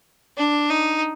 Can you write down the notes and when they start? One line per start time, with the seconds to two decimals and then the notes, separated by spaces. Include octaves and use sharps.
0.37 D4
0.70 D#4